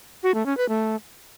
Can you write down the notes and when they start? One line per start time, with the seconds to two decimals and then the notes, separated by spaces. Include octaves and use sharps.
0.23 F#4
0.34 A3
0.46 C#4
0.57 B4
0.69 A3